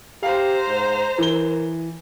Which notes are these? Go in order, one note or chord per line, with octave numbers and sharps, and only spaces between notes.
G4 C5 F5 A#5
G#2
E3 A#4 G7